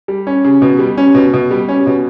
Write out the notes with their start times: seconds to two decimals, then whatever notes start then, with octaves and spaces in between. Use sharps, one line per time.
0.08 G3
0.27 C#4
0.44 C#3
0.62 B2
0.79 G3
0.97 C#4
1.14 B2
1.33 B2
1.51 G3
1.69 C#4
1.86 B2